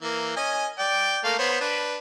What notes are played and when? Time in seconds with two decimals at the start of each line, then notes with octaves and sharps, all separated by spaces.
0.01 E3 A#3
0.36 C#4 D#5 G#5
0.79 D5 G5
1.24 A3 A#3 F5
1.39 B3 C5 C#5
1.61 D4 B4